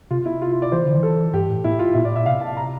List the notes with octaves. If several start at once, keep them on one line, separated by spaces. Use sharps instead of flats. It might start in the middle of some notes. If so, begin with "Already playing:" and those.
C3 F4
E4
F4
F4
D5
E3 C5
D3
E3
A4
G2 G4
A2
A2 E4
F4
A#2 E4
A2 D5
A#2 E5
C3 F5
A5
A#5